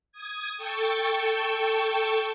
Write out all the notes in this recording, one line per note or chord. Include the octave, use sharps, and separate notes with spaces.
D#6 G#6
A4 G5 A5 C#6